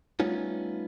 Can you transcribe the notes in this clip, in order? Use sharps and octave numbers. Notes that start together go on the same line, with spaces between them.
G3 A3 B3 C#4 D#4 F4